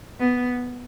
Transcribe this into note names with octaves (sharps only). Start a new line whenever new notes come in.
B3